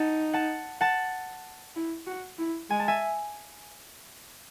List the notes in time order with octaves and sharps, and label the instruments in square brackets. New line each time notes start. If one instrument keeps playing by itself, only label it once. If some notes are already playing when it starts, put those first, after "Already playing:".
Already playing: [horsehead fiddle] D#4 [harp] F#5 A5
[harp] F#5 A5
F#5 A5
[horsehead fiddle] E4
F#4
E4
[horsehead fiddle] G#3 [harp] G#5
[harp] A5
E5 G#5